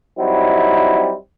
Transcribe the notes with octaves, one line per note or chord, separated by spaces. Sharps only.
F#3 G3 C4 D#4 E4